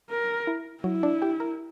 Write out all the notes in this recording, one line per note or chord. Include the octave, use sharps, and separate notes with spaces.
A#4
E4
F#3 E4 F#4
D4 D5
G4 G5
A#4 A#5